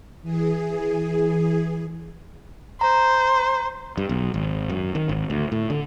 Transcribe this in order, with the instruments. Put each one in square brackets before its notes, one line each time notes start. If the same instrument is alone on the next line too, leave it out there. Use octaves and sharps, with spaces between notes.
[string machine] E3 G#4
[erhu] C5 [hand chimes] A#5
[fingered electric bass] G2
B1
G#1
F#2
D#3
G#1
D2
A2
D3